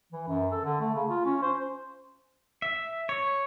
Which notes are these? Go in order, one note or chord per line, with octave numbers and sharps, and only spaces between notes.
E3
F#2
A4
D3
A3
C#3
F4
C#4
C5
E5
C#5